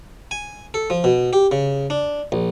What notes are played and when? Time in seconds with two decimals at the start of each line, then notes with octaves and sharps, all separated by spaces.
0.31 G#5
0.74 A4
0.90 F3
1.04 B2
1.33 G4
1.51 C#3
1.90 D4
2.32 A#1